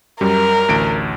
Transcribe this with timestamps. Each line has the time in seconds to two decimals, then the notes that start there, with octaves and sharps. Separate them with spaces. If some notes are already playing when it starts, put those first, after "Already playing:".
0.21 F#2 G3 A#4
0.68 A1 D2 D7